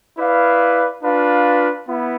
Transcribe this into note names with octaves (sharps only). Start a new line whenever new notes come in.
E4 B4 D5 F5
D4 F4 B4 F5
B3 E4